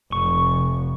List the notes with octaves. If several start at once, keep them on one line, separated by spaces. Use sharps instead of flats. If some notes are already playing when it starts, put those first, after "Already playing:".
F1 C#6